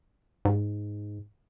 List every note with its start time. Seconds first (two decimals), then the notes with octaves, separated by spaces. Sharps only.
0.45 G#2